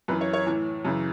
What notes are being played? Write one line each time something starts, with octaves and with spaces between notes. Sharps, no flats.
F#2 E3 B4
C#5
C#5
A2 E3
F#2 C#3 E3